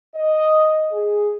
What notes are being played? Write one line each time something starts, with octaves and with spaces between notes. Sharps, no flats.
D#5
G#4